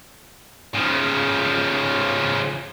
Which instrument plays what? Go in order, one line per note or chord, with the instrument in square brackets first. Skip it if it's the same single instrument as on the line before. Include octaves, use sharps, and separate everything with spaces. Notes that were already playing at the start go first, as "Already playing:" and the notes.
[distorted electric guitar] C#3 F3